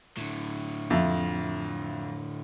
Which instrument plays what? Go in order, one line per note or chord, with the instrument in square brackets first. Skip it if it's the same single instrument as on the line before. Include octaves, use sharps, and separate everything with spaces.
[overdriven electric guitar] A2 D3
[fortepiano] F2 E5